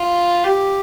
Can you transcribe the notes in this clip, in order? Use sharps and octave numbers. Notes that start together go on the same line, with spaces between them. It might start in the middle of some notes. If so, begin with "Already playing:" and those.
Already playing: F4
G4